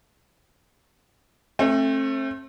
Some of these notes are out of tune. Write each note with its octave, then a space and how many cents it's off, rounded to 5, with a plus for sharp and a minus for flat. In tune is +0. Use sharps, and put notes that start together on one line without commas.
A3 +0 C4 +40